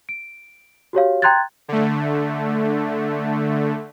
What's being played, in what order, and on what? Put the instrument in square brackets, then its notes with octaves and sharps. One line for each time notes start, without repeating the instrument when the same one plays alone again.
[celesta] D7
F#4 G4 C#5 F5
G5 A#5 C6 F#6 G#6 A6
[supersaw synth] D3 A3